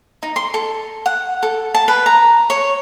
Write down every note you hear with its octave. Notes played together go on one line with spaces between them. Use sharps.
D#4
C6
A4
F#5
A4
A5
B4
A#5
C#5